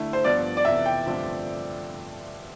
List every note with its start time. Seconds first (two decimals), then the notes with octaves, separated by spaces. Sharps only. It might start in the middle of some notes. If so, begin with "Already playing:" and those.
Already playing: D3 A3 E4
0.13 C5
0.24 G2 F3 B3 F4 D5
0.57 D5
0.65 F2 C3 E3 B3 E5
0.86 G5
1.06 G2 D3 F3 A3 C4